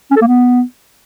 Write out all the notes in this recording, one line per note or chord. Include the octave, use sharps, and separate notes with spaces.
C#4
A4
A#3
B3